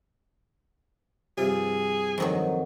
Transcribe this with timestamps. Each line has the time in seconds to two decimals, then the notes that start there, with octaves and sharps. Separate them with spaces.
1.38 G2 C3 F3 G#4
2.18 F2 D#3 F#3